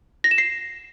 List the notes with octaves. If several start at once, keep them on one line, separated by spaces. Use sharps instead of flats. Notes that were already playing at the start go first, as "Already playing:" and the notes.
A#6
E7
C7